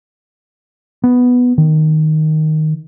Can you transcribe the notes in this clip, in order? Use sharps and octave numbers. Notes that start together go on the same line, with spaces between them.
B3
D#3